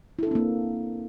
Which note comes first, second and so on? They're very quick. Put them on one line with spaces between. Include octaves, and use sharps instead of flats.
E4 A4 D4 C4 A#3